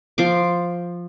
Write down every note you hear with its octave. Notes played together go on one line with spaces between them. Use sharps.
F3 C6 D6